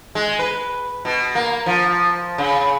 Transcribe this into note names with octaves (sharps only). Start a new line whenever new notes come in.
G#3
B4
B2
A#3
F3
C#3